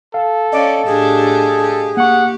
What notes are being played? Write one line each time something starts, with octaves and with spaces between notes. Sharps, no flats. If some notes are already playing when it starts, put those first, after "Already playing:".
A4 F5
C#4 D5 D#5 F5
A2 D4 G4 G#4
G4
A#3 G4 F#5 C#6